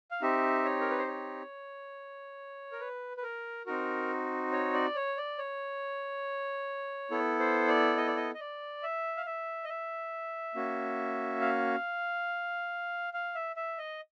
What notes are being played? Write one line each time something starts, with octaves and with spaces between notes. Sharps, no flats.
F5
C4 D#4 G4 E5
C#5
A#4
B4
C5
C#5
A#4
B4
B4
A#4
C4 D#4 F#4 A#4
C#5
D5
C#5
D5
C#5
B3 E4 A4
C5
D5
D#5
D5
D#5
D#5
D5
E5
F5
E5
D#5
E5
A#3 C#4 F#4
F5
F5
E5
E5
D#5